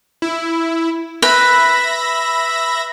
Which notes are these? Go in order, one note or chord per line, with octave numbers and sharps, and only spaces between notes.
E4
B4 E5 B5 A#6